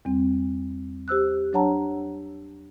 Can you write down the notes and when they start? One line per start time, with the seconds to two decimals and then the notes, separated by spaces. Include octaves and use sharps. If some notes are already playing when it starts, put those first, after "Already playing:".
0.05 E2 G3 C4
1.08 G4 C5 E6 F#6
1.53 F#3 D4 C#5 F#5 A5 A#5